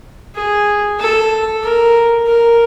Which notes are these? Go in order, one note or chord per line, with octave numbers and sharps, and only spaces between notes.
G#4
A4
A#4
A#4